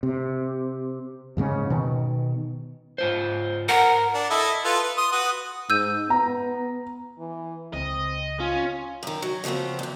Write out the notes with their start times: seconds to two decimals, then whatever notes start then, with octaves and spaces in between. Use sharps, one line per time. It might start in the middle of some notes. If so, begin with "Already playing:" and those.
0.03 C3
1.37 D#2 G#2 C#3 C#4
1.70 B2 D#3
2.98 G#2 F4 C5
3.69 A#4 F#5
4.15 D4
4.30 E4 A4 D#5
4.65 F4 A4 B4
4.83 B4
4.97 C6 D#6
5.12 F#4 B4 D#6
5.70 G#2 E6 G6 D#7
6.10 B3 A#5
7.19 E3
7.73 C#2 C4 D#5
8.40 C#4 F4
9.03 F#2 D#3
9.22 F#3
9.44 C#3 F3 A3 B3 C4
9.79 E2 G2